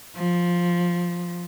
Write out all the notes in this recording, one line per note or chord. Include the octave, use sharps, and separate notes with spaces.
F3